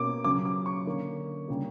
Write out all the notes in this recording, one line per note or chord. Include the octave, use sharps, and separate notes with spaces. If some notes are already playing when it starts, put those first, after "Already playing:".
Already playing: B2 A#3 C#4 D6
C#3 F#3 C#4 D6
D6
C#6
D3 A#3 C#4
C#3 G3 A#3